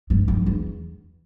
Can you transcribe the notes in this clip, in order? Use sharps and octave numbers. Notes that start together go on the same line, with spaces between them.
G2
F2
E2